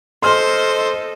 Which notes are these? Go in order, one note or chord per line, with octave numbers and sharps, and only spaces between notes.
A4 C5 D#5 C6 F6